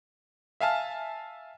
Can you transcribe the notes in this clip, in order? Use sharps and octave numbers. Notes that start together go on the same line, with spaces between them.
E5 F5 G#5 A5 F6